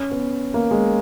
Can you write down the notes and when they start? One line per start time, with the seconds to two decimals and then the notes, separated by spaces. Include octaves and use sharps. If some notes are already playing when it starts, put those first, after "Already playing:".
Already playing: C#4
0.11 B3
0.54 A#3
0.71 G#3